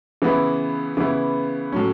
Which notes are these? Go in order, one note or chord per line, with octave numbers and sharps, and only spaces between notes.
C#3 E3 B3 E4
C#3 E3 B3 E4
A2 F#3 C#4